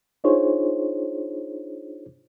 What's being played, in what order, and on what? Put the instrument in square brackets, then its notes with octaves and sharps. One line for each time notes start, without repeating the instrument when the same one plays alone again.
[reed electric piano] D4 D#4 F4 G#4 C5 C#5